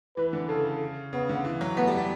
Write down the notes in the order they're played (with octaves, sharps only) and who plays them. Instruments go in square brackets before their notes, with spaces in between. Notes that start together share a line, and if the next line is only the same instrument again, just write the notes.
[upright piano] E3 [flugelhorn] B4
[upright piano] D3
[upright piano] C#3 [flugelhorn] A4
[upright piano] C#3 [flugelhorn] B3
[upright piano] D3
E3
F#3
[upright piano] A3 [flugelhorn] B3
[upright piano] G3
G3